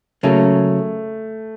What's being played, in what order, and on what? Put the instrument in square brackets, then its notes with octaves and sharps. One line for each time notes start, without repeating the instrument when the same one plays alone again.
[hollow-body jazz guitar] C#3 F#3 A#3 C#4 [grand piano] A3